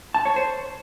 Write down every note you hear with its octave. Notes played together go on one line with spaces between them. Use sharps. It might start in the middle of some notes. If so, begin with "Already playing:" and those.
A5
C#5
C5